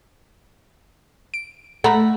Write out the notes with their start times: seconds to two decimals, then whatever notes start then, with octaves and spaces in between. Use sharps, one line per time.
1.34 D7
1.84 A3 F#5 A#5 B5